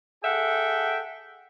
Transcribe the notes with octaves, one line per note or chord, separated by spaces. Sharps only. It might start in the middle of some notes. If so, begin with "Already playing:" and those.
G#4 A4 E5 F#5 G5